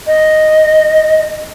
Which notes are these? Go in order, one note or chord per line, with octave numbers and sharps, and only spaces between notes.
D#5